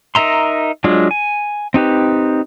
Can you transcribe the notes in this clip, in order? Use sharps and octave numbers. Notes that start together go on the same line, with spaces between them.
D#4 A#4 E5 A#5 C6
F#3 G#3 D4 F4
G#5
C4 D#4 G4 B4